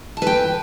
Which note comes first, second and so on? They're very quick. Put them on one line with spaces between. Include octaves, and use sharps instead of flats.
A5 B4 G5